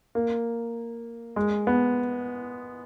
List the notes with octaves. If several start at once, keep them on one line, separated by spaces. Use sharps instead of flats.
A#3
G#3
B3